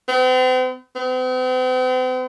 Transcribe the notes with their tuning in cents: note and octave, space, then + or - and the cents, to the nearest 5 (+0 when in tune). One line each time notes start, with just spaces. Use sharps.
C4 -45
C4 -45